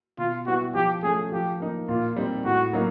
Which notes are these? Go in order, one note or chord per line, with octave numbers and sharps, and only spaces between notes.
B2 F4
G3 B3 E4 F#4
F3 G4
A3 C#4 G#4
F3 G4
A#3 D#4
A#2 F4
G3 C4 D#4
A2 F#4
F#3 A#3 D#4